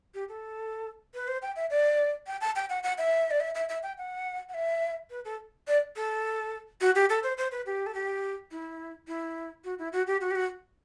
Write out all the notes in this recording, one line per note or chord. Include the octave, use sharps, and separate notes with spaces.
G4
A4
B4
C5
G5
E5
D5
G5
A5
G5
F#5
F#5
E5
D5
E5
E5
E5
G5
F#5
F#5
E5
B4
A4
D5
A4
F#4
G4
A4
C5
C5
B4
G4
A4
G4
E4
E4
F#4
E4
F#4
G4
F#4
G4
F#4